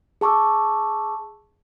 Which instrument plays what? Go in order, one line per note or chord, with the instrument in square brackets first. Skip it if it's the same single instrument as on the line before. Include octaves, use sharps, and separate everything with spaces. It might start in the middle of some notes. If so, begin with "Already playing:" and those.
[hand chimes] G#4 A5 C#6 D6 E6